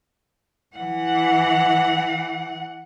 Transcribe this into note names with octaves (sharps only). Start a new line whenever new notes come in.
E3 F#5